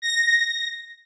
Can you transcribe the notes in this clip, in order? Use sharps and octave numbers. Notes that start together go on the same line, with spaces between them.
A#6